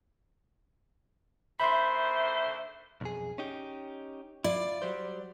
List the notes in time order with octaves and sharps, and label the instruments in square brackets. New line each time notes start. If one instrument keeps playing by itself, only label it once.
[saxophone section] D#2 D3 C5 [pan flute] E5 [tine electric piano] B5 C6
[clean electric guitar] B1 F2 G#4
C#4 D#4 G4
[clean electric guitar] E4 F4 [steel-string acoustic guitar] D5
[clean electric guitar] F#3 G3 C5